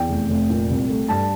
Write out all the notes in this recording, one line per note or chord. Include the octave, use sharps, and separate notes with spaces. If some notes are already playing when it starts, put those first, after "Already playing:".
Already playing: E2 G5
F1
F1
A#2
C2
A3
G2 A5